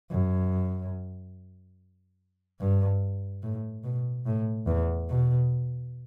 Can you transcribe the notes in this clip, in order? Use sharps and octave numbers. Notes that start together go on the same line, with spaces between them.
F#2
G2
A2
B2
A2
E2
B2